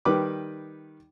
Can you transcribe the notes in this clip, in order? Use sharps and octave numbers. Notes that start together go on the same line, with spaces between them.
D#3 G3 B4 D6